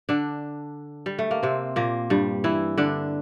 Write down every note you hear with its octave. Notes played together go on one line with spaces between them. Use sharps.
D3 D4
G3
A3
A#3
C3 C4
A#2 A#3
G2 G3
E3 E4
D3 D4